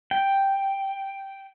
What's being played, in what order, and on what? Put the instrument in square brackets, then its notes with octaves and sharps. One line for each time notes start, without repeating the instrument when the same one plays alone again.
[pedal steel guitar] G5